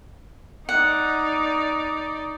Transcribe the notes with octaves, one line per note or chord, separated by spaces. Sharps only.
D#4 D5 F#5